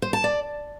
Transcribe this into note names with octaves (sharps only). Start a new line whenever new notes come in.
C5
A5
D5